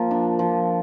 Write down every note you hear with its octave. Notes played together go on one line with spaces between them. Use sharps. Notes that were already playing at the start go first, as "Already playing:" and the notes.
Already playing: F3 A#3
D4
F3